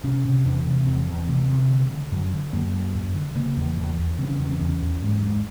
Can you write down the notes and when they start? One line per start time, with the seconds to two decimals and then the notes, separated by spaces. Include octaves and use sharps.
0.04 C3 C#4
0.25 C3
0.45 E2 D4
0.66 C3
0.87 E2 C4
1.08 E2
1.28 C3 A3
1.49 C3
1.70 D3
1.91 D3
2.12 F#2
2.33 D3
2.53 F#2 A#3
2.74 F#2
2.94 F#2
3.15 D3
3.35 C#3 A#3
3.57 E2
3.77 E2
3.98 E2
4.19 C#3 C4
4.29 C#4
4.39 E2 C#4
4.50 C4
4.60 E2 C#4
4.81 E2
5.02 G#2
5.22 G#2